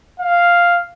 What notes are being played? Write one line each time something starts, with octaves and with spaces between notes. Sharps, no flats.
F5